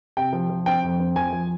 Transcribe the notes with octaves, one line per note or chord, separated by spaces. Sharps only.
C3 G5
F3
F3
C4 G5
F2
C4
F3 G#5
F3